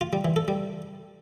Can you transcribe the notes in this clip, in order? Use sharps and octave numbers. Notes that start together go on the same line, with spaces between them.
F4
G3
E3
A4
G3